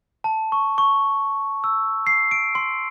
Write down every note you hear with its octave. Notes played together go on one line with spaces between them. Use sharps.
A5
C#6
C#6
E6
C7
D7
C6